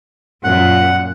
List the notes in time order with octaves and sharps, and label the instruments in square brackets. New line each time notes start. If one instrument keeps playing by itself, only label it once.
[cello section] F#2 A#2 [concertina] F#5